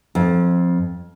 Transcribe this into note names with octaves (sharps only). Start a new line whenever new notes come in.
F2